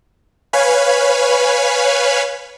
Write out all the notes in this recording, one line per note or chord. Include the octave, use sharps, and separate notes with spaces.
B4 C#5 F5 G#5 B5